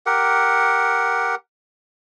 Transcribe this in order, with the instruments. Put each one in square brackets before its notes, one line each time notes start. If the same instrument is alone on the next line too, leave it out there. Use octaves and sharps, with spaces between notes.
[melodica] G4 A#4 F#5